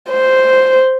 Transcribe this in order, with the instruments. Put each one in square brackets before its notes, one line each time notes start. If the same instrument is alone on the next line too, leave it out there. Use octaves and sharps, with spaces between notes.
[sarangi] C5